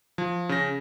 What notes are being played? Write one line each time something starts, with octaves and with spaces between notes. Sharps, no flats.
F3
C#3 A#6